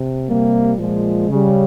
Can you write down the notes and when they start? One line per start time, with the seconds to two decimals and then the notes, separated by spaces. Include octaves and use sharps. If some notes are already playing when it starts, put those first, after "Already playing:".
Already playing: C3
0.27 C3 G3 A#3
0.79 A#2 F3 G#3
1.29 C#3 G3